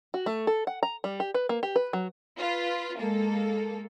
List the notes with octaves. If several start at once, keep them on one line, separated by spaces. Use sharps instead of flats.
F#4
A3
A4
F#5
A#5
G3
G4
B4
A#3
G4
B4
F#3
F4 B4
G#3 A#3 A4